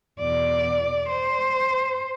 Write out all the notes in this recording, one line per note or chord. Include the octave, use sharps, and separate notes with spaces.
E2 B2 D5
C5